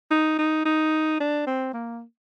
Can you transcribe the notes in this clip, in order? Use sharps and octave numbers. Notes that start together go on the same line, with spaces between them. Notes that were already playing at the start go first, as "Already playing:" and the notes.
D#4
D#4
D#4
D4
C4
A#3